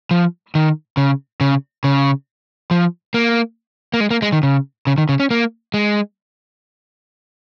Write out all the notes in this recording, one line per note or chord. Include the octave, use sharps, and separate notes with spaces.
F3
D#3
C#3
C#3
C#3
F3
A#3
A#3
G#3
A#3
G#3
D#3
C#3
C#3
D#3
C#3
C#4
A#3
G#3